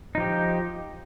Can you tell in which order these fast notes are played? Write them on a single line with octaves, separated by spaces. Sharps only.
D#4 F3 G4